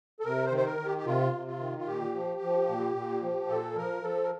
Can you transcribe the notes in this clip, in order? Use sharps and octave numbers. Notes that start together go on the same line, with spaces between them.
A4
C3 A#4
C5
D#3
C5
A#4
D#3
G4
G4
C3 F4
C3
F4
D#3
F4
A#2 G4
F3
F3
A#2
A#2
F3
A#2 A4
F3 A#4
F3 A4
A#4